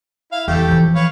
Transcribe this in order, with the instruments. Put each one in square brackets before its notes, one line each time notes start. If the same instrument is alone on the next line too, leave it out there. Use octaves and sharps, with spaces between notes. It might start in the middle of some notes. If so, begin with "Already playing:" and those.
[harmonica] E4 F5
[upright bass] E2 [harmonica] A3 G4
[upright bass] E3 F3
[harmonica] B4 C#5 F5